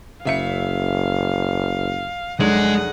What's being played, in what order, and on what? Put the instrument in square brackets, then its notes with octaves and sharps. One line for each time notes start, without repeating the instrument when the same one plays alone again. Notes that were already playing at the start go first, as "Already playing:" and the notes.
[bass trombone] F#1 [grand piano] C#3 E5 C#7 [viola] F5
[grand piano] F1 F#3 D4 [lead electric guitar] G#3 [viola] G#4 F#5